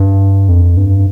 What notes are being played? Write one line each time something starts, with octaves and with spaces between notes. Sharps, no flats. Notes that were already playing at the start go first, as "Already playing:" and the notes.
Already playing: G2
F2
G2